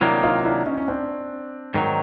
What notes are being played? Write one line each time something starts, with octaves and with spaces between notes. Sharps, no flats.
C3 D#3 F#3 A#3 D4 E4
D#4 F4
D4 E4
C#4 D#4
C#4
C4 D4
G#2 D#3 F#3